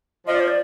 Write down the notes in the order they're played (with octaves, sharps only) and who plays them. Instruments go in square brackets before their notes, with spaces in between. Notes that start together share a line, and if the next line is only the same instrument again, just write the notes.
[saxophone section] F3 [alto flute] D#5
[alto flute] D5
C5
D5